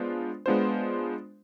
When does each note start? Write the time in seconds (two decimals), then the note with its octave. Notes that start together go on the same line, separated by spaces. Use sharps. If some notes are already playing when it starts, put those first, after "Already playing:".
Already playing: G#3 B3 D4 F4 C5
0.46 G#3 B3 D4 F4 C5